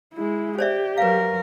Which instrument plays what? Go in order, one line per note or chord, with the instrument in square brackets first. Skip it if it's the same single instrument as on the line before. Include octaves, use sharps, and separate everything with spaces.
[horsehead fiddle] G#3 E4
[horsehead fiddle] G4 [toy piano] C5 D5 E5
[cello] F#3 A#4 [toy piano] B4 F5